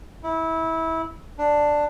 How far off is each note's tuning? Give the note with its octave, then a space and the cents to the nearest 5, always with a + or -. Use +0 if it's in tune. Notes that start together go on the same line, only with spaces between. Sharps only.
E4 -20
D4 +5